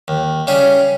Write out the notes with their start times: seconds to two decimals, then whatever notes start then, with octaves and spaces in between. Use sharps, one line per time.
0.08 D#2
0.47 C#3 G3 C#4 G#4